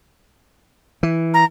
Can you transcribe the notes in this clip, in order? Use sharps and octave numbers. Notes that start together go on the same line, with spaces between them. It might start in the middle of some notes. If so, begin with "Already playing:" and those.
E3
A#5